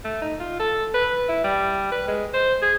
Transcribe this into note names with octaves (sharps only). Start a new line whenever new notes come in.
A3
D#4
F4
A4
B4
E4
G3
B4
G#3
C5
G#4